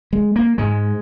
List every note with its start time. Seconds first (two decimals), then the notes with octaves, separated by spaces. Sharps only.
0.13 G#3
0.36 A#3
0.58 G#2 G#3